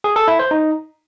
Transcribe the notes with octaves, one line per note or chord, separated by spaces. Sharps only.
G#4
A4
E4
C5
D#4